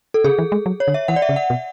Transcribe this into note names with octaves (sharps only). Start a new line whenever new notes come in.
A4
C#3 G#4
E3
G#3
F#3
C#5
D3
E5
E3 F#5
D5
E5
C#3
F#5
B2